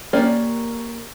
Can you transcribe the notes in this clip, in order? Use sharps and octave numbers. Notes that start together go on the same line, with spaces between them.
A#3 C#4 G4 D5